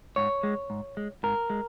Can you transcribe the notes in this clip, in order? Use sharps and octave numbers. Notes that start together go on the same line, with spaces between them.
G#2 C#5
G#3
G#2
G#3
G#2 A#4
G#3